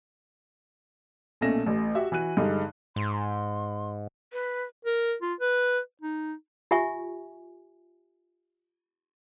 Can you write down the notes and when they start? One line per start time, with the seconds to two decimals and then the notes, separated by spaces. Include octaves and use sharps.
1.41 B1 A#2 A3 C#4 A#6 E7
1.66 A1 A2
1.95 F#4 G4 E5
2.12 E3 F#4 F#6 D#7
2.37 G2 D3 G#3 D#4
2.96 G#2 C6
4.33 B4
4.85 A#4
5.22 F4
5.41 B4
6.02 D#4
6.71 F4 G4 E5 G#5 C#6